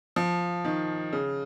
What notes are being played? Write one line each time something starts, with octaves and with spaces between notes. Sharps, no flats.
F3
D#3
C#3